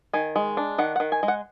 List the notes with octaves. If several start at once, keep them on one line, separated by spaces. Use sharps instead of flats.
D#3 G#5
G#3
D4
D#3 F#5
D#3 F#5
G#5
G#3
F#5